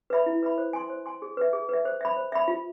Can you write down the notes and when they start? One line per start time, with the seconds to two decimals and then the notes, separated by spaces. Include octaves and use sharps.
0.10 B4 E5 B5
0.26 E4
0.43 B4 E5 B5
0.58 C5
0.73 G#5 C6
0.90 C5
1.06 G#5 C6
1.22 G#4
1.37 B4 E5
1.53 G#4
1.69 B4 E5
1.85 C5
2.01 E5 B5
2.16 C5
2.32 E5 B5
2.48 F4